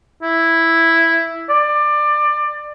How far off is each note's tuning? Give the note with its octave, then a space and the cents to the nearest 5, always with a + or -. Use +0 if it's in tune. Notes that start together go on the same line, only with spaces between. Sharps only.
E4 +0
D5 +20